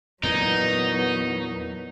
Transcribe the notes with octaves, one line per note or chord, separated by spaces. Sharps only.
E2 A#2 F#3 B3 D#4